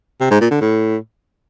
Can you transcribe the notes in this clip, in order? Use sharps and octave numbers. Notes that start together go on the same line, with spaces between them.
C3
G#2
A#2
D3
A2